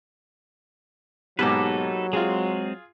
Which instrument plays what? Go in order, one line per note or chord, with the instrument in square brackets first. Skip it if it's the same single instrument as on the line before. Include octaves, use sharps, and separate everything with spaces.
[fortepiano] G#2 B2 [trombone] F#3 [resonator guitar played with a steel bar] A#3 G4 [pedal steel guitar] D#4 A4 B4
[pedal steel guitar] G#3 C4 [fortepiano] F4 G#4